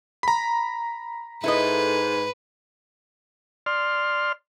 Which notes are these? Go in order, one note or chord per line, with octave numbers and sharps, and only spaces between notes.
A#5 B5
G#2 E4 A4 B4 D#5
D5 C6 F6